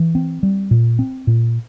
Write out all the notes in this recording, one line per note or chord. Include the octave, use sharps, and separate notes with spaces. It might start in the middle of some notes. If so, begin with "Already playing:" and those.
Already playing: E3
C4
G3
A#2
C4
A#2